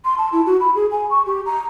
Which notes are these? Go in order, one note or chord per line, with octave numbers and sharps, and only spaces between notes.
C6
A5
E4
F#4
B5
G#4
G#5
C#6
G4
A#5